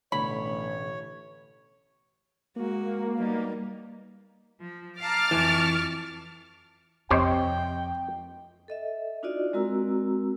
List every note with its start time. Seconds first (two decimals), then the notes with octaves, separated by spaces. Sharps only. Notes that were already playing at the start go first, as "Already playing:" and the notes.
0.12 A1 B2 D3 A3 C#5 B5
2.56 G#3 A#3 F#4
3.16 G3 B3 D#4
4.61 F3
4.99 F5 A5 A#5 D6 F6 A6
5.31 F2 E3 A5 C#6
7.11 F2 C3 G4 C5 C#5 D#5 G5
8.68 A4 D#5 E5
9.23 D4 D#4 F4 F#4 D5 D#5
9.53 G#3 C4 F#4 A#4 A#5 E6